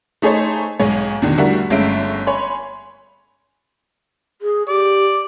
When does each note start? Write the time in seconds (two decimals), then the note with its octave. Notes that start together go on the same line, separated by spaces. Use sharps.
0.22 A3 D#4 G#4 A4 C5 C#5
0.79 B1 G#2 G#4 C#5
1.22 E2 B2 D3 D#3
1.38 D3 G3 A3 E4 F#4 A#4
1.70 G1 G#3 A3 C#4 E5 D7
2.27 C#5 G#5 B5 C6
4.42 G#4
4.69 G4 D5